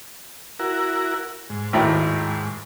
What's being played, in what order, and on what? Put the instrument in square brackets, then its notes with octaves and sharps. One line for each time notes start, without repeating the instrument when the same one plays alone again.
[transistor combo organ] E4 F#4 A#4
G#2
[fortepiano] G#1 D#2 A2